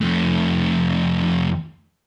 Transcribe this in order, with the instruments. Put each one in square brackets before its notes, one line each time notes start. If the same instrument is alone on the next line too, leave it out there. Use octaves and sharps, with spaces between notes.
[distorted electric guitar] F2 A3